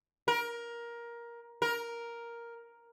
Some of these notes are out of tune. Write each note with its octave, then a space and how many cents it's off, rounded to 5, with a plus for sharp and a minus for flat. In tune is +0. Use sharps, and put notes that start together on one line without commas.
A#4 +15
A#4 +5